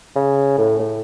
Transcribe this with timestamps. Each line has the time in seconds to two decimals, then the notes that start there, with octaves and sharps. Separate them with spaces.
0.16 C#3
0.58 A2
0.80 A2